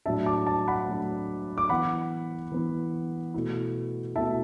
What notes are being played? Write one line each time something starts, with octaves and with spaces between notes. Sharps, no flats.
A2 F#3 D4 E5 A5
A5 D6
A5 D6
F#5 B5
A2 F#3 D4
D6
E3 B3 E4 F#5 B5
E3 B3 E4
B2 A3 E4
B2 A3 E4 E5 A5